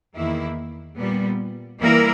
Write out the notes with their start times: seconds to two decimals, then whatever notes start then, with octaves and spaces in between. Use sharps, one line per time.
0.16 E2 D#3 A#3 E4
0.97 A#2 G3 B3
1.79 E3 G3 A#3 E4 A#4